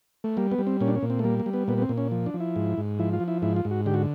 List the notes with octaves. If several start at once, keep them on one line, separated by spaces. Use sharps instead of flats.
A3
G3 A#3
B3
G3
C4
A#2 C#4
D4
C#4
A#2
C4
A3
G3 A#3
A#3
G3
B3
A#2 B3
B3
C4
A#2
C#4
F3
D4
F3
E4
G#2
G#2
F3 E4
F4
F3
E4
G#2 E4
F4
G#2
F#4
D3 G4
F#4